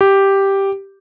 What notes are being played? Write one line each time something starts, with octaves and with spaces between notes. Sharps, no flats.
G4